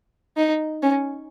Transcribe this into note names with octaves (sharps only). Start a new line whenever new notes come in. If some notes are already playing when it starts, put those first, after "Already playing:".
D#4
C#4